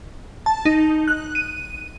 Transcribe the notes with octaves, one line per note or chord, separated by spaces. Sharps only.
A5
D#4
F#6
D#7